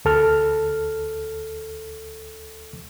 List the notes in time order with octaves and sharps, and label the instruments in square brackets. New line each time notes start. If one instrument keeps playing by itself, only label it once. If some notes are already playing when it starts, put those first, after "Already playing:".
[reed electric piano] D2 A4 F6